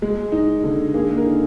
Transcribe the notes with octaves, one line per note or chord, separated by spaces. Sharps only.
G#3
D#4
D3
A#3 G#4
A#4
D#4